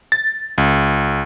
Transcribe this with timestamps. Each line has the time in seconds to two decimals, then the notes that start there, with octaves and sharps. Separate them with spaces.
0.12 A6
0.58 C#2